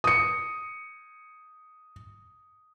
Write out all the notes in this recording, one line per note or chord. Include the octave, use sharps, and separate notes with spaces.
D#6 C#7